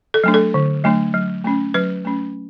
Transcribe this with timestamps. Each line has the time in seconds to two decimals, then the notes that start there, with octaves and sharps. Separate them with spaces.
0.14 A4
0.24 F#3 A3 D4
0.34 A4
0.54 D3
0.84 F#3 A3 D4
1.14 F#3
1.44 A3 C#4
1.74 F#3 B4
2.05 A3 C#4